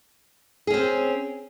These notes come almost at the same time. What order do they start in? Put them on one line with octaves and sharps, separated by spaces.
G#4 C#4 C4